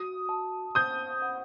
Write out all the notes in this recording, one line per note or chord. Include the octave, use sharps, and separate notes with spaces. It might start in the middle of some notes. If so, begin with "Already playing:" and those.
Already playing: F#4 D#6
A5
C5 D#6 G6
F#5